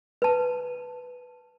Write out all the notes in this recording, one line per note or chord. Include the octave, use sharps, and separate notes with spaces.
B4 A5